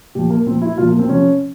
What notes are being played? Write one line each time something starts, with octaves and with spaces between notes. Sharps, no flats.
A#2 F3 G4
A#3
A#2 F3 C4
E4
A#2 F3 F4
A#3
C4
C3 F3 C#4